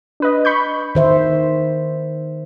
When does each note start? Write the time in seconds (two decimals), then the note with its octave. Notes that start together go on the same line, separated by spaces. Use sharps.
0.20 D4 B4 D#5
0.45 B5 C#6 G6
0.95 D#3 C5 E5